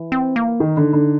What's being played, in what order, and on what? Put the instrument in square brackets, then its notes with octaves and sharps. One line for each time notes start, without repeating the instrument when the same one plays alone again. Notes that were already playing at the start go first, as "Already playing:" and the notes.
Already playing: [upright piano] E3
[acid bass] C4
A#3
[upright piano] D#3 [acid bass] D#4
[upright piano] D3
D3